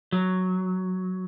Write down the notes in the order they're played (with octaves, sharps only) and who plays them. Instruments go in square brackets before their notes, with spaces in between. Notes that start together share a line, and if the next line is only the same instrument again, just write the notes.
[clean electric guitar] F#3